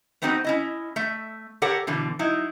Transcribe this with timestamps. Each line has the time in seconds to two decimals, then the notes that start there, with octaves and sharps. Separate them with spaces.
0.22 A3 B3 C4 D#4 F#4 B4
0.44 C#4 E4 D#5
0.96 A3 E5
1.62 G4 A4 A#4 C#5 F#5
1.87 B2 D3 E3
2.19 F#3 D#4 E4